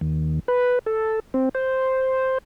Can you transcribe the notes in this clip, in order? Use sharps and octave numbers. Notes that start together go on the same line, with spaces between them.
D#2
B4
A4
C4
C5